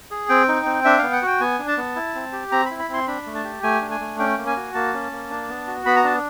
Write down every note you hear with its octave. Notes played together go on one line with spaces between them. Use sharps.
G#4
C4 G5
D#4
C4
D4 E5
B3 F5
F#5
F#4 G5
B3 G#5
D4
A5
B3
E4
C4
G4
C4 A#5
B5
E4
B5
C4 C6
D4 B5
A3
A5
G4
A3 G#5
D4
G#5
A3
C#4 G5
A#3
G#5
F#4
A#3 A5
C#4
A#3
D4
B3
F#4
B3 B5
A#5
D4 A5